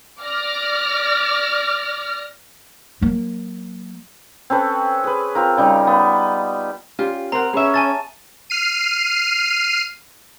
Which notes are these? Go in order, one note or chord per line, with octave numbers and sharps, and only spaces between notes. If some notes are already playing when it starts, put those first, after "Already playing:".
D5 D6 F6 A#6
F#3 A#3
C4 C#4 A4 B4
G#4 B4
C4 F4 A#4
C#3 G3 D#4
B3
C#4 F4 G4 D5
C4 A#4 C5 F#5 A#5
B3 C#4 G#4 B4 E5
G#5 A5 A6
F6 C7 D#7